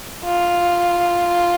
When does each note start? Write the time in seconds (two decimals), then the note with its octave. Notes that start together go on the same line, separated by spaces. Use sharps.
0.25 F4